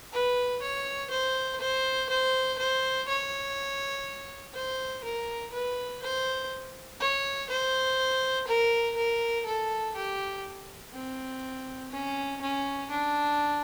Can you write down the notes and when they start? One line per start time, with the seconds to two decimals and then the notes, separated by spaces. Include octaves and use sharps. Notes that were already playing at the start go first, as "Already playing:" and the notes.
0.12 B4
0.62 C#5
1.10 C5
1.60 C5
2.09 C5
2.58 C5
3.08 C#5
4.54 C5
5.04 A#4
5.52 B4
6.02 C5
7.00 C#5
7.50 C5
8.47 A#4
8.96 A#4
9.46 A4
9.96 G4
10.93 C4
11.91 C#4
12.41 C#4
12.90 D4